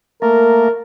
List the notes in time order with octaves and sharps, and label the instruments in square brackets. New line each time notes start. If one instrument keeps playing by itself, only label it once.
[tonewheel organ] A3 A#3 [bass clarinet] A#4